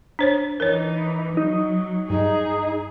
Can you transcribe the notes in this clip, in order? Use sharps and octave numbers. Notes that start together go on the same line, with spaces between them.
D4 C5 C#5
E3 D#4 A#4 C#5
F#3 D#4
G2 D#4 G#4